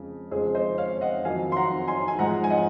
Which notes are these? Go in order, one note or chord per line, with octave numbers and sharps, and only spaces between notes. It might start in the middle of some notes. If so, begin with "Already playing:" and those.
Already playing: F2 C#3 G#3
F2 C#3 G#3 G#4 C5
C5 D#5
C#5 F5
D#5 F#5
F2 D#3 F#3 F5 G#5
C6
F#5 A#5
G#5 C6
G#5
G#2 F3 G#3 F#5 A#5
G#5
D#5 F#5